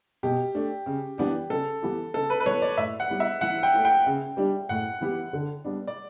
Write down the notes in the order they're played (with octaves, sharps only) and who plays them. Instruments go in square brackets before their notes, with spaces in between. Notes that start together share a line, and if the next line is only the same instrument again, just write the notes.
[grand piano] B2 [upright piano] G4
[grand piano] A3 D4
C#3
E3 B3 D4 G4
[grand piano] C#3 [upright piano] A4
[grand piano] E3 B3 E4 G4
[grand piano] C#3 [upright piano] A4
[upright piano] B4
B4
[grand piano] E3 B3 [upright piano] C#5
[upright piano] D5
[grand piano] A2 [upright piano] E5
[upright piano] F#5
[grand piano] G3 B3 E4 G4
[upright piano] E5
[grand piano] E3 [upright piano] F#5
[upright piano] G5
[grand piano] A3 E4
[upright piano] G5
[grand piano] C#3
G3 D4 G4
[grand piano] A2 [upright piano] F#5
[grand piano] E3 B3 E4 G4
D3
G3 B3 D4
[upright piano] D5